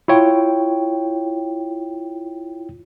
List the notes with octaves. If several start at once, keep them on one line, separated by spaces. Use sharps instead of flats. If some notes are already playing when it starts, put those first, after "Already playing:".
E4 F4 C#5 G5